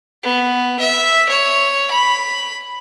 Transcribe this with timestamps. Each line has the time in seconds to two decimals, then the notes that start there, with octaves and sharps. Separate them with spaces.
0.23 B3
0.80 E5
1.29 C#5
1.91 B5